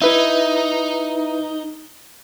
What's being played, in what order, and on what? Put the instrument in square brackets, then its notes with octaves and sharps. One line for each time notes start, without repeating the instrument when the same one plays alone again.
[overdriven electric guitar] D#4 [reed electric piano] E4 B4 E5